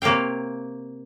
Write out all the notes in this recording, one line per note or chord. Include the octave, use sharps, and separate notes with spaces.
C3 A#3 C#5 F5 G5